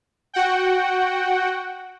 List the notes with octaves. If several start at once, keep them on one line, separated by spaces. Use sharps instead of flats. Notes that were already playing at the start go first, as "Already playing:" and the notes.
F#4 F#5 G5